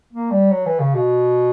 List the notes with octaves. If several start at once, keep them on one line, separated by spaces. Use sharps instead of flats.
A#3
G3
F#3
E3
C#3
B2